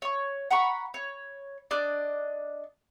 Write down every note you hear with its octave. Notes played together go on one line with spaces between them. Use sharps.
C#5 C#6
F#5 A#5 B5 C#6
C#5
D4 D5 D#5 F#6